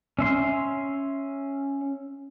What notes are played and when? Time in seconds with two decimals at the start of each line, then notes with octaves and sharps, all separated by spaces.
0.19 C#4 E5 C6